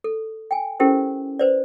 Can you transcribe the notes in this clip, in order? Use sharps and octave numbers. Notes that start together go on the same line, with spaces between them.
A4
G5 G#5
C#4 E4 G4 A4 A#4 C5
B4 C5 D5